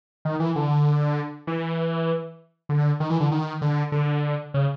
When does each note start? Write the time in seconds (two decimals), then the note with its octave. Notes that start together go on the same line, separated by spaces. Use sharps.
0.25 D#3
0.40 E3
0.56 D3
1.47 E3
2.69 D3
3.00 D#3
3.10 E3
3.20 D3
3.32 D#3
3.61 D3
3.92 D3
4.54 C#3